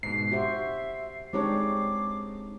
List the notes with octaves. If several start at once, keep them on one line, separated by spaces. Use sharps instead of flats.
G#2 B2 C7
F#4 G4 C5 E5
G#3 C4 D4 D#4 G4 C#5 D6